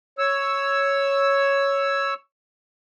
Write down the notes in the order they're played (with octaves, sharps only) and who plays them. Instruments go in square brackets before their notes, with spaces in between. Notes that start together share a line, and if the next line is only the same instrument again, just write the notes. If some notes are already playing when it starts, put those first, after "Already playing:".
[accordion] C#5 E6